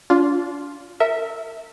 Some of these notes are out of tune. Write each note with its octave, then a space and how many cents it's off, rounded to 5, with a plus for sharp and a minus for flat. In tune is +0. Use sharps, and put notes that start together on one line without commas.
D4 -35 F4 +5
A#4 -35 E5 -15